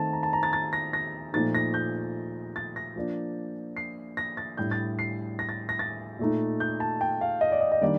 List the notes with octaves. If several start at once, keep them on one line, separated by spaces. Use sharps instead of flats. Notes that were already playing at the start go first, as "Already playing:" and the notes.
Already playing: D#3 A3 C4 A5
A#5
A5
A#5
A6
A6
A#6
A#6
A#2 F3 A3 D#4 A6
A#6
G6
A6
A#6
F3 A#3 D4
C7
A#6
A6
A2 G3 D4 G6
A6
C7
A#6
A6
A#6
A6
A#2 A3 D#4
G6
A5
G5
F5
D#5
D5
D#5
D#5
D#3 G3 A#3 D4 D5